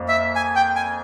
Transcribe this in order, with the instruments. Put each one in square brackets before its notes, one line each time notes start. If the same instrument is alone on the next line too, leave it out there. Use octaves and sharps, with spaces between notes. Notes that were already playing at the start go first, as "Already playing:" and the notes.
Already playing: [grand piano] F2 A#3
[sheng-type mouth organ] E5
G#5
G5
G#5